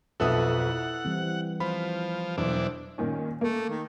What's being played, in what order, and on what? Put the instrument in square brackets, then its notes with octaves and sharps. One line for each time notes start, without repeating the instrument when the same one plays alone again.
[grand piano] B1 F2 B3 [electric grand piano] A4 E5 D#6 [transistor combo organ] F#5
[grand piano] E4
[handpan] E3 G3 C4
[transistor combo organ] F3 [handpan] C5 [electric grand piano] B5
[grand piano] E1 [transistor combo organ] E3 D4 [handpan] F#3 C5
[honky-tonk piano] A#2 D#3 C#4
[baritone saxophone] A3 [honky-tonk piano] A#3
[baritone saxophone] D#3